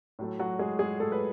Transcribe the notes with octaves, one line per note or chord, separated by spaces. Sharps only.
A2 F#3 A3
F#3 F#4
G#3 G#4
G#3 G#4
A2 F#3 A3 A4
B4